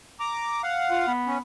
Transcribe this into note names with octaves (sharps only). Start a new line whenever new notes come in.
A#5 D6
F5 F#5
F4
B3
C#4